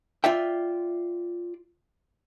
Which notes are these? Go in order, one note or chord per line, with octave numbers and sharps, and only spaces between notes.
F4 D5 E5 G5